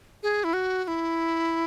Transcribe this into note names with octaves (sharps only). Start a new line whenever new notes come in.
G#4
E4
F#4
F#4
E4